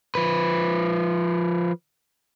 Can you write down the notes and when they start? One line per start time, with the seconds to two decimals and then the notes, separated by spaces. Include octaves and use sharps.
0.15 F3 B4